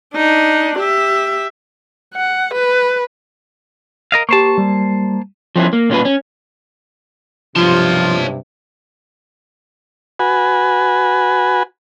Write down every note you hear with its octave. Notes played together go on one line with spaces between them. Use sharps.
D4 D#4
G4 E5
F#5
B4
A#4 D#5 F5
A#3 G4 C5 A5 C#6
G3
F3 C4 C#4 E4
A#3
A#2 C#4 F4 B4
C#4
B1 G2 C3 F3 F4 C#5 A5
F#4 B4 G#5